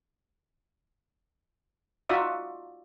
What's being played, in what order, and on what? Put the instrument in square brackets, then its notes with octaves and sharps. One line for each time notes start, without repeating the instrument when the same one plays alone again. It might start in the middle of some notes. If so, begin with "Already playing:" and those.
[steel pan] D#4 F4 F#4 D5 E5 D#6